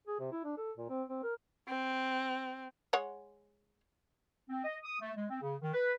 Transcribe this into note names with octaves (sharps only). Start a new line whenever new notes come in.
G#4
C3
E4
D4
A4
A#2
C4
C4
A#4
C4
G#3 C#5 F#5
C4
D#5
D#6
A3
G#3
C4
C#3
D#3
B4